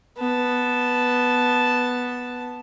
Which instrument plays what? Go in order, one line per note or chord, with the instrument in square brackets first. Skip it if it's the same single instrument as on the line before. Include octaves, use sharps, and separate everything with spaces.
[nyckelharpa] B3 A5